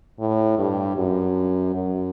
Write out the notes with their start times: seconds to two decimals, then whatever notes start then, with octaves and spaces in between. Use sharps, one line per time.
0.20 A2
0.58 G2
0.97 F#2
1.75 F#2